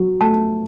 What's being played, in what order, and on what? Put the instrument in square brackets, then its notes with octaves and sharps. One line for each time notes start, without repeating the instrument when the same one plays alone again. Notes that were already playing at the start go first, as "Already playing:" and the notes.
Already playing: [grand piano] F#3
[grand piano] A3 [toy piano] A5